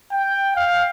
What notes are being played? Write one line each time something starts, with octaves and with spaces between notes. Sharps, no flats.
G5
F5